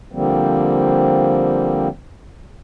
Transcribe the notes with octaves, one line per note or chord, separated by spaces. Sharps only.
D3 F3 G3 A#3 C4